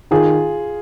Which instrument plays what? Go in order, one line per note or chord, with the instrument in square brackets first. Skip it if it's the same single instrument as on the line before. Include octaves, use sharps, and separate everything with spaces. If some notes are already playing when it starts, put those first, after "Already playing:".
[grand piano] D#3 [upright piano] F4 G#4